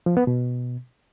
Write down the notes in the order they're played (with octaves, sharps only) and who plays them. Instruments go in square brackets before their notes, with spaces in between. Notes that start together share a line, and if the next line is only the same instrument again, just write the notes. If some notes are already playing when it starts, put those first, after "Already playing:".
[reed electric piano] F3
B3
B2